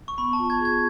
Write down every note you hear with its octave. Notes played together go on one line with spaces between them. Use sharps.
C#6
B3 B5
A5
F4
G#6
G#4
G#6